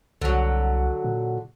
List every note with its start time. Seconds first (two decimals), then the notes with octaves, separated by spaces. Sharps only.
0.22 C2 D3 F#3
1.04 A#2